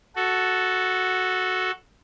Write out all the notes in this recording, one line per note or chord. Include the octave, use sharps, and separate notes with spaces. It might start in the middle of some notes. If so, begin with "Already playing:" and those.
F#4 A4